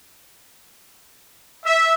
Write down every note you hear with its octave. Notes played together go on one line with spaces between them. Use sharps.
E5